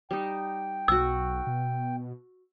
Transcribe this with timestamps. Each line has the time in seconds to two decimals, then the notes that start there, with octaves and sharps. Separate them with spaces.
0.11 G3 D#4 G5
0.88 B1 F#4 C#6 E6
1.47 B2